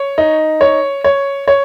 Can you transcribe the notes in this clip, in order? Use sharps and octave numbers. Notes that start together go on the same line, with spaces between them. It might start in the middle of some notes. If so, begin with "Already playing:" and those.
Already playing: C#5
D#4
C#5
C#5
C#5